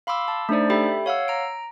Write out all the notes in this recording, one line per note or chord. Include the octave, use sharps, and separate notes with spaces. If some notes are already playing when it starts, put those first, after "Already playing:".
F5 B5 C6 D6 E6
A5
A3 D4 D#4 C5 D5
G4 A4 E5 G5 B5
C#5 F5 F#5 E6
A#5 D7